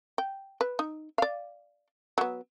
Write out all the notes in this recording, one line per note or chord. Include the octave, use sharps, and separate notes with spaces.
G5
B4
D#4
D5 F5
F#3 B3